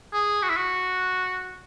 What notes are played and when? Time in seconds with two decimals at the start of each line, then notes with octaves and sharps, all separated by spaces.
0.14 G#4
0.43 F#4
0.50 E4
0.57 F#4